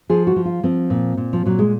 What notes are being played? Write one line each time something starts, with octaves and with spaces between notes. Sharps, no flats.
F3 G#4
F#4
F3
F4
F3 C4
A#2
A#2
F3
A#2 F#3
G#3